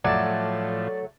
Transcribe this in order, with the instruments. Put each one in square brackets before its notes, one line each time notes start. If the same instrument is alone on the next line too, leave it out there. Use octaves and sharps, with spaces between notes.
[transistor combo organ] A2 F3 [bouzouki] F#3 A3 [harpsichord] D5 A5